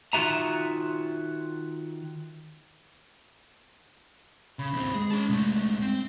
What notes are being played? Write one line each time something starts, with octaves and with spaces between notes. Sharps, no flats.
D#3 F4 F#4 E5 A#5
C#3 B5
D#2 C4
G#3 G#4
C#4 A5
C2 A3
C4